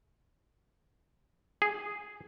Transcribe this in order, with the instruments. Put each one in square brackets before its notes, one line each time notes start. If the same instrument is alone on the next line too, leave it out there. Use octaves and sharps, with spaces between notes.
[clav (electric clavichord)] G#4